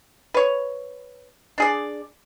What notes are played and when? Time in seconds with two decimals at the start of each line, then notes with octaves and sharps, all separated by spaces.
0.34 B4 C#5
1.58 D4 G#4 D5